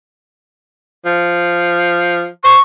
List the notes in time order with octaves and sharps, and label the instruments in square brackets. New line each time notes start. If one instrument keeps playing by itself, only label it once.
[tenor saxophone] F3
[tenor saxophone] C5 [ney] C#6